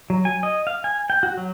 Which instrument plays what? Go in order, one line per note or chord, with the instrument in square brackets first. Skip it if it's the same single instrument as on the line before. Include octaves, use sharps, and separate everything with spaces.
[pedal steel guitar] F#3
G#5
D#5
F5
G#5
G5
F#4
F#3